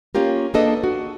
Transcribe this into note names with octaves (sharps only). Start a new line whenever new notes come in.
A#3 C#4 F4 G4 A#4
A#3 D4 G#4 A4 B4 D#5
F#4